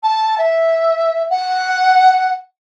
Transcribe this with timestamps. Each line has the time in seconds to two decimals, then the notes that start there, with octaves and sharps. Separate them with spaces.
0.03 A5
0.38 E5
1.30 F#5